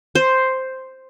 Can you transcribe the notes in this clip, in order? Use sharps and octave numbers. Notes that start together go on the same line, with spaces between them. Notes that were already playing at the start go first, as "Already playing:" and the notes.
C5